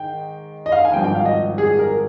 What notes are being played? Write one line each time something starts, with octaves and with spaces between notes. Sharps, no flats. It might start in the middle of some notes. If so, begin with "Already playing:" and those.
Already playing: G#2 D#3 G#3 G5
D#5
F5
G#5
G#1 G2 F3 G5
G5
F5
D#5
G#4
A#4